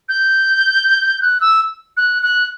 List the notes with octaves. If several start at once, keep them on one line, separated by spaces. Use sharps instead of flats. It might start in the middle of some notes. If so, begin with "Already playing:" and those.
G6
F#6
E6
F#6
F#6